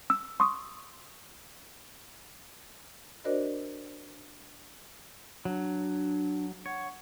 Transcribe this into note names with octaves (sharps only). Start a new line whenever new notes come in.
E6
C6 C#6 D#6
D4 F#4 A#4 C5 D5 D#5
F#3 D4
C#5 F#5